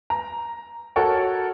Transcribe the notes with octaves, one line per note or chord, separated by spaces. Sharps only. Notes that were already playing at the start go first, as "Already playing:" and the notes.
A#5
F#4 A4 A#4 C#5 F#5